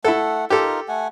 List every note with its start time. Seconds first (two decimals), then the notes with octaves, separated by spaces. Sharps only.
0.05 A3 E4 A4 F#5
0.50 D#4 F4 G4 A4 A#4
0.89 A3 F#5 G#5